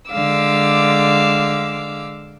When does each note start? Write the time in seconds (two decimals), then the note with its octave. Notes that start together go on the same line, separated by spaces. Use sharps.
0.11 D3 G#3 F5 D6 E6